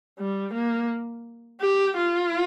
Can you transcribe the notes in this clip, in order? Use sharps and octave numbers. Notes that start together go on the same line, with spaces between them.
G3
A#3
G4
F4